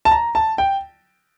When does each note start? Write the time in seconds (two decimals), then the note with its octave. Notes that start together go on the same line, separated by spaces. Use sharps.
0.05 A5
0.11 A#5
0.35 A5
0.58 G5